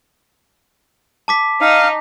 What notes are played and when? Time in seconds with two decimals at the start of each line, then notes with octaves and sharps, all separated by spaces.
1.28 A5 D6 B6
1.61 D#4 F5